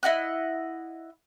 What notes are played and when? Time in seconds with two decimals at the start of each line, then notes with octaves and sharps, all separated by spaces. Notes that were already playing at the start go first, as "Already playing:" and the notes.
0.03 E4 D#5 F#5 F#6